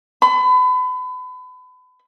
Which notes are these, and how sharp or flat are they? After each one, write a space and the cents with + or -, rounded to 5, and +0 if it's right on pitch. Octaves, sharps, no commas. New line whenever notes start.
B5 +35